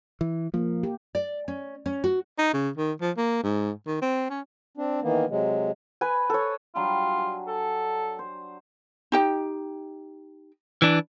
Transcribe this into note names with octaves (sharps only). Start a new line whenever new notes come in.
E3
F3 A#3
G4
D5
C#4
C#4
F#4
D#4
C#3
D#3
F3
A#3
G#2
D#3
C4
C#4
C4 D4
D#3 E3 A#3 B3
C3 F#3 G#3
B4 G#5
A4 C#5
F#3 G3 D4 F4
G#5
A4
C5
D#4 G4 G5
E3 D4